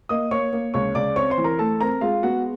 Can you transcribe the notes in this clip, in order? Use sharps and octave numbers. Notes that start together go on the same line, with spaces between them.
A#3 D#5 D#6
A#3 C#5 C#6
A#3
C#2 C#5 C#6
C#2 D5 D6
C4 C#5 C#6
C5 C6
E3
A#4 A#5
A3 A4 A5
C4 A#4 A#5
G#3 F4 F5
B3 F#4 F#5